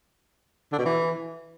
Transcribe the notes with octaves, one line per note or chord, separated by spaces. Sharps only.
D3
B2
E3